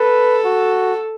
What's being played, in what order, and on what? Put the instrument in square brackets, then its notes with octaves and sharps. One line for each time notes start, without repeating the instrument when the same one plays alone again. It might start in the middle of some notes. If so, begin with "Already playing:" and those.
Already playing: [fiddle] A4 [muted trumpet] B4
[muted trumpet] F#4